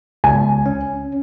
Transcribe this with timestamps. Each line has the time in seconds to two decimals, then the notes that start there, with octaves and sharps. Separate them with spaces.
0.24 C#2 G#5
0.66 C#4